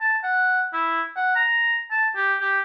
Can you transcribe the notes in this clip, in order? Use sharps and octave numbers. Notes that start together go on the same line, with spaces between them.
A5
F#5
E4
F#5
A#5
A5
G4
G4